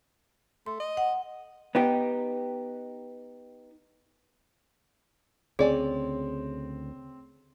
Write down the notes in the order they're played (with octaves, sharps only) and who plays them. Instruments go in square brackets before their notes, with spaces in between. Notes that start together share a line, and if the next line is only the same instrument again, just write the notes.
[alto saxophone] A3 [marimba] C6
[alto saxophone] D#5
[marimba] F#5
[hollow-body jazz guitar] B3 D#4 G4
[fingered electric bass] D2 C#3 [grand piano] C4 [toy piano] G#4 [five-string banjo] C#5 D5 G#5